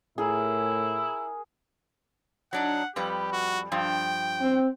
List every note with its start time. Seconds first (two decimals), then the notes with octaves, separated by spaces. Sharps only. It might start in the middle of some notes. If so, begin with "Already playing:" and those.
0.18 A2 E4 G#4 A#4
2.53 F#3 D4 D#4 F#5
2.96 F2 G3 G4 B4
3.32 F#4
3.72 G2 F3 G5
4.41 C4